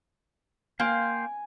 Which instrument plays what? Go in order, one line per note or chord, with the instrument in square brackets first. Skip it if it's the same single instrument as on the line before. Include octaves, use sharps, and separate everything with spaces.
[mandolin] A#3 [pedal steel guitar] F5 G5 C6 [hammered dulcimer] G#5